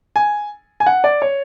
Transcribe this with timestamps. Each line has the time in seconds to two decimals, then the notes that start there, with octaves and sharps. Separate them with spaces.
0.16 G#5
0.80 G#5
0.86 F#5
1.04 D5
1.22 C#5